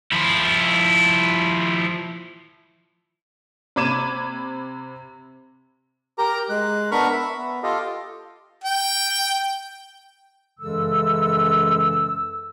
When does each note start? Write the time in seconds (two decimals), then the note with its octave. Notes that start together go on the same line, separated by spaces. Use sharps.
0.12 F3 E4
3.76 C3 B5 D6 G#6 D#7 E7
6.18 G4 A#4 A#5
6.49 G#3 F#6
6.91 B3 D4 A#4 B5 C#6 F6
7.13 E5 B5
7.38 B3
7.63 F4 G4 A4 D#5 F5
8.64 G5
10.59 F#2 C#3 E3 G#3 A4 E6